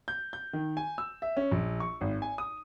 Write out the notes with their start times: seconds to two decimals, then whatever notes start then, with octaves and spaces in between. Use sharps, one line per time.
0.08 G6
0.33 G6
0.53 D#3
0.77 G#5
0.98 E6
1.22 E5
1.37 C#4
1.51 A#1
1.80 C#6
2.01 G#1
2.22 G#5
2.38 D#6